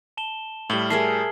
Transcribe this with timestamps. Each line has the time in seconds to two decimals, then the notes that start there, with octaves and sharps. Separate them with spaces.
0.17 A5 E7 G7
0.70 A2 G3 F5 F#7 G7
0.90 G#4 A#4 E5 A5 C7